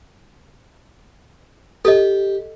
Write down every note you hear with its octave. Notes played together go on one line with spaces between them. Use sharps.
G4 A4 D#5